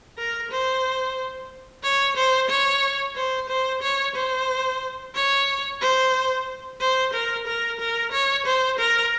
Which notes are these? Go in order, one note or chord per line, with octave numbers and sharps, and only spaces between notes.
A#4
C5
C#5
C5
C#5
C5
C5
C#5
C5
C#5
C5
C5
A#4
A#4
A#4
C#5
C5
A#4